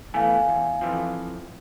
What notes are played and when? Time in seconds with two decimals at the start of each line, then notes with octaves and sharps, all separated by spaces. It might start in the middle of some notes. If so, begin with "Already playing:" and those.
0.14 E3 A3 B3 F5 G#5
0.49 E2
0.81 F2 E3 F3